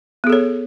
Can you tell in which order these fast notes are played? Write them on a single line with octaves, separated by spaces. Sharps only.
B3 G#4 A4 C#5